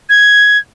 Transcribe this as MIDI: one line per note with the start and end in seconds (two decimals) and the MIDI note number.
0.09 0.58 92